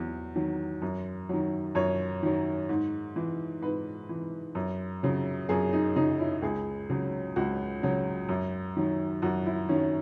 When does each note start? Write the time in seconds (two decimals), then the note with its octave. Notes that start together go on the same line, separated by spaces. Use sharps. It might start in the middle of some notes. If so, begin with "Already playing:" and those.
Already playing: E2 F#3
0.35 D#3 F#3
0.82 F#2
1.29 D#3 F#3
1.75 F#2 C#5
2.23 D#3 F#3
2.69 G#2
3.16 E3
3.62 G#2 B4
4.09 E3
4.55 F#2
5.03 C#3 F#3
5.49 F#2 G#4
5.73 D#4
5.96 C#3 F#3 D#4
6.19 E4
6.42 C#2 G#4
6.90 C#3 F#3
7.36 C#2 F#4
7.83 C#3 F#3
8.29 F#2
8.77 D#3 F#3
9.22 F#2 F#4
9.46 E4
9.69 D#3 F#3 C#4